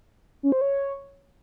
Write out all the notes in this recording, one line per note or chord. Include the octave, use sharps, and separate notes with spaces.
C#4
C5
C#5